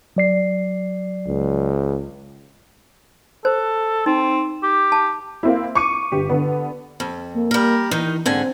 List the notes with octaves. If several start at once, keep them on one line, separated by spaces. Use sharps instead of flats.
F#3 D5 C7
C#2
A4 C5
C4 D#4
G4
A5
A#3 C4 E4
C#6 D6 C#7 D#7
G1 G4
D3 B3
F2
A#3
G3 A#4
D#3 E3 D#4
G#2 D3 C4 G#5